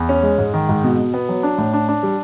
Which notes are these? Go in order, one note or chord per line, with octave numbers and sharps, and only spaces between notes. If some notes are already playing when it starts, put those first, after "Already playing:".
Already playing: E2
C#4
G#3
G#2
D#3
G#2
B2
B2
B3
F#3
D4
A2
D4
D4
G3